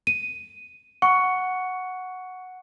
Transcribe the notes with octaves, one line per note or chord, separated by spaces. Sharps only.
D#7
F#5 C#6